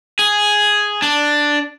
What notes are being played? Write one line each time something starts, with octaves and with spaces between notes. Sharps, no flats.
G#4
D4